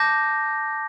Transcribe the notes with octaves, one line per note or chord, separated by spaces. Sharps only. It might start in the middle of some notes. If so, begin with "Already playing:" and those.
Already playing: A5 D6 G6 A#6